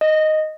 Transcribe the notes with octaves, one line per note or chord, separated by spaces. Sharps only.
D#5